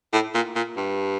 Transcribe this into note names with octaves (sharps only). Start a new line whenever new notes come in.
A2
A#2
A#2
G2